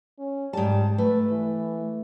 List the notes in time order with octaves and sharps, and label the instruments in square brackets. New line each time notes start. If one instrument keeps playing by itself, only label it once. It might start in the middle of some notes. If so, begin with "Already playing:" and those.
[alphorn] C#4
[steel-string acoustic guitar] G#2 A5 [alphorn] G3
[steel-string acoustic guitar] A3 [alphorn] B4
[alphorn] E3